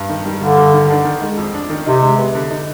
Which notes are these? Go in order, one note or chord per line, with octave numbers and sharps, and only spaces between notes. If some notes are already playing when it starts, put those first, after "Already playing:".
Already playing: G2
D#3
G3
G2 D3
G2
D#3
D4
D#3
G#3
F2
D4
D#3
C3 D#4
G#3
B3
D3
D#4